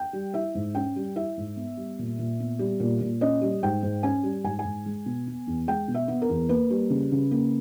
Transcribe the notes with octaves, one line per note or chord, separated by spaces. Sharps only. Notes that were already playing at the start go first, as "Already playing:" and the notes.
Already playing: G5
G3
E4 E5
G#2
C#4 G5
G3
E4 E5
G#2
B3
G3
A#2
A#2
B3
G3
A#2
A#2
C#4 D#5
G3
G#2 G5
G#2
C#4 G#5
G3
G#2 G#5
G#5
G#2
G#3
B2
B3
E2
G#3 G5
B2
E5
B3
A#4
E2
A#3 B4
G3
C#3
C#3
A#3